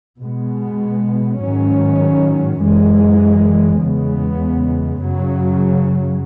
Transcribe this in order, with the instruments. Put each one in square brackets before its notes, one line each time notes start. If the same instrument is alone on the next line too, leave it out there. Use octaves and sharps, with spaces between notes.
[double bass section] B2 G#3 B3
G#2 D#3 F#3 C#4
F#2 E3 G#3
E2 C#3 G#3 B3
F#2 C#3 F#3